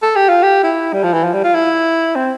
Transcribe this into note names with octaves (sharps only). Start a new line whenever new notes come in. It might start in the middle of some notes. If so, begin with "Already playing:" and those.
A4
G4
F4
G4
E4
G3
F3
E3
F3
G3
F4
E4
C4